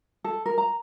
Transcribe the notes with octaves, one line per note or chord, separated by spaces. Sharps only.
A4
A#4
A#5